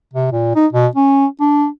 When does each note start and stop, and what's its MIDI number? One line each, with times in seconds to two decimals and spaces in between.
0.14 0.31 48
0.32 0.51 46
0.56 0.67 63
0.73 0.87 47
0.96 1.26 61
1.41 1.67 62